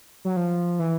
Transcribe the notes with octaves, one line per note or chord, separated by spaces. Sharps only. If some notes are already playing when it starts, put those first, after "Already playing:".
F#3
F3
E3